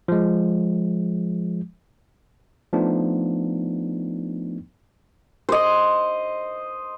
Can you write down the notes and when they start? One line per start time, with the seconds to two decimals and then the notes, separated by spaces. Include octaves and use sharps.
0.08 F3 G#3
2.73 F3 A3 B3 D4 D#4
5.49 C5 D#5